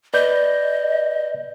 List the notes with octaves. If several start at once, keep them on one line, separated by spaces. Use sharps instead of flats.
B4 D5 D#5 G6